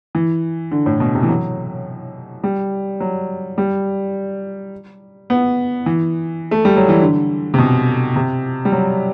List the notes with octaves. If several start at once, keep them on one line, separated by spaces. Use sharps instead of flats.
E3
D3
A2
B2
C3
E3
F#3
G3
F#3
G3
B3
E3
A3
G3
F#3
E3
D3
C3
B2
C3
G3
F#3